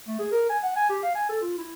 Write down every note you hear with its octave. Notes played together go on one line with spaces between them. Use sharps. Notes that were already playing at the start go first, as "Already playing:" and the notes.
A3
G#4
A#4
G#5
F#5
G#5
G4
F5
G#5
A4
F4
E4